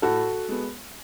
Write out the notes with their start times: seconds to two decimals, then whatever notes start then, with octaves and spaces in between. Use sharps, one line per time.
0.02 A2 F#4 A4
0.49 G#3 B3